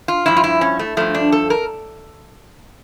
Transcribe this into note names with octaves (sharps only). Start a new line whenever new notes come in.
F4
G2 F3 E4
F4
E4
C#4
A3
G2 F3 A3
D4
A4
A#4